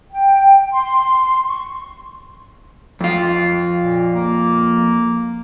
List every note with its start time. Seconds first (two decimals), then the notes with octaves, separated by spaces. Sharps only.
0.11 G5
0.73 C6
1.48 C#6
3.01 F2 F4
3.82 A#2
4.15 A#3